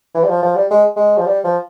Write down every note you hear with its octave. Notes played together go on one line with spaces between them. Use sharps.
E3
G3
F3
F3
G3
G#3
G#3
F3
G3
F3